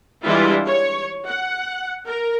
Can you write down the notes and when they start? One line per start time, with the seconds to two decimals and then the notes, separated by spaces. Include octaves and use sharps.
0.24 E3 G3 G#3 D4 E4 F4
0.67 C#5
1.28 F#5
2.06 A#4